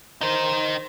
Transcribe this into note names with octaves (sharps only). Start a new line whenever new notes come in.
D#4 A#4 C5